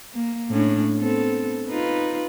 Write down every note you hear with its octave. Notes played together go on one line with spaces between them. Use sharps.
A#3
A2 C#4 D4
B3 C4 A4
D#4 F4 B4